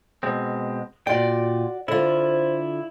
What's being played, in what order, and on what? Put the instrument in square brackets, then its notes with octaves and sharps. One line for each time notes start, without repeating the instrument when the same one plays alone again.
[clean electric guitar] B2 G#3 C4
[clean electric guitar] A#2 F4 G5 [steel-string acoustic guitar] F#4 D5
[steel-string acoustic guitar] D3 F4 [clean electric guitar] E4 [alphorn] C5